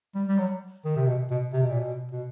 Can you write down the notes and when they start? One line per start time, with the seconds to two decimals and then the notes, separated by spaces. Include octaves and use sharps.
0.15 G3
0.28 G3
0.38 F#3
0.85 D#3
0.96 C3
1.07 B2
1.30 B2
1.53 C3
1.63 B2
1.70 A#2
1.80 B2
2.12 B2